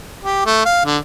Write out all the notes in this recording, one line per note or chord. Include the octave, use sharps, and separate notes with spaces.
G4
A3
F5
D3